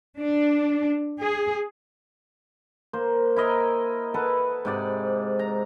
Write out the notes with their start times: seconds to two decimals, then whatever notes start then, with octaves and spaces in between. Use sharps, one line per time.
0.18 D4
1.21 G#4
2.93 A#3 C5
3.36 E4 A#4 D#5
4.14 A4 B4 F#5
4.65 G#2 C3 D5
5.39 A#5